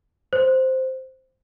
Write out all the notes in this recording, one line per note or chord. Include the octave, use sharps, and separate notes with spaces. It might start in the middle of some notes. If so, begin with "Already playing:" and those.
C5